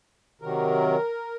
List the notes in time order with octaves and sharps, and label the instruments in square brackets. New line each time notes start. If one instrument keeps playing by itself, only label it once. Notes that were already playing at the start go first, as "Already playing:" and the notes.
[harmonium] C3 D#3 F#3 A#4